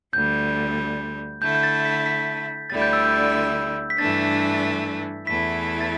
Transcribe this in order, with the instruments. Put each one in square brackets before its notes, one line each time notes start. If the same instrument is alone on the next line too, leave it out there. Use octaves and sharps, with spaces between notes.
[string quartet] D2 D3 G3 [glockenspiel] G6
[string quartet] D3 A3 E4 [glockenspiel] G6
[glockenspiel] G6
A6
B6
B6
[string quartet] D2 D3 G3 E4 [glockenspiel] A6
[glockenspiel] G6
E6
G6
B6
[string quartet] G2 E3 A3 D4 [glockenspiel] A6
[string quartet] E2 E3 A3 E4 [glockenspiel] B6
[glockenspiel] A6